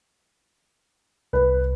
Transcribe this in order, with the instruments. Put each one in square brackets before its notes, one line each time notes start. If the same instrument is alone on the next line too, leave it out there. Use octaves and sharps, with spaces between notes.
[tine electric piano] C2 [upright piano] B4